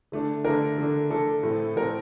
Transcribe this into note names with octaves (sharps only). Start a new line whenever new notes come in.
D3 A3 D4
D3 A3 D4 A#4
D3 A3 D4
D3 A3 D4 A4
A2 A3 C4
A2 A3 C4 A#4